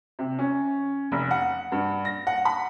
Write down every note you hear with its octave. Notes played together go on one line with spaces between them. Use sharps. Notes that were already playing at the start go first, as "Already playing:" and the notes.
C3
C#4
F1
F#5
G2
A#6
F#5
B5